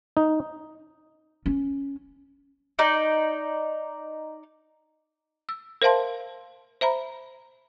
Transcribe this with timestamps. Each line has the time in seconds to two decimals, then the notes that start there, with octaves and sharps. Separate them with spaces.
0.17 D#4
1.46 C#4
2.79 D#4 D5
5.49 E6
5.82 A#4 C5 E5 F5 A5 C6
6.81 C5 E5 A#5 B5